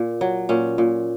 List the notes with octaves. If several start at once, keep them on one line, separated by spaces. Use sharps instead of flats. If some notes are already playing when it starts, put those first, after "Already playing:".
Already playing: A#2
F#3
A#2 C#4
A#2